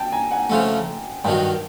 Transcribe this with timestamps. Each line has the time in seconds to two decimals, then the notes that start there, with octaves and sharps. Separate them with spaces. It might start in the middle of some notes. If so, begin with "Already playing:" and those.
Already playing: G5 A5
0.12 G#5 A#5
0.31 F#5 G#5
0.50 C#3 F3 A3 F#5 G#5
1.25 G2 D#3 F#3 G5 A5